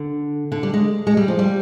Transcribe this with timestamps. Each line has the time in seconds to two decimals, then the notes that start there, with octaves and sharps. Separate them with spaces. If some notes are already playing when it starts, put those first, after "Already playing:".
Already playing: D3
0.52 D3
0.63 G3
0.73 G#3
1.07 G#3
1.17 G3
1.28 F3
1.39 G3